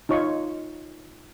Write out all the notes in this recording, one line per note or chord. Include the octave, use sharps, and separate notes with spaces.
D#4 F4 C#5 C#6